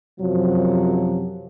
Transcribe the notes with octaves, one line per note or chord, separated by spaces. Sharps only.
F#2 C3 F3 F#3